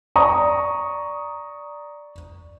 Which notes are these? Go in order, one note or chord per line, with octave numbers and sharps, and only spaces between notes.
D5 A#5 C#6 D#6